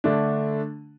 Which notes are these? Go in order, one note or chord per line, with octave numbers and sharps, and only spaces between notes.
D3 A3 D4